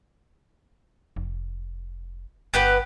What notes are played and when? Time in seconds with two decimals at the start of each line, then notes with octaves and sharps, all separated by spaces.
1.16 F1
2.54 G1 B3 G4 B4